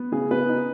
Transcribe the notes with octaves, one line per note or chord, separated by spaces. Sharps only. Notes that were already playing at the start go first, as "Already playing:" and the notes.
Already playing: B3
C#3 G#4
B3 B4
D#4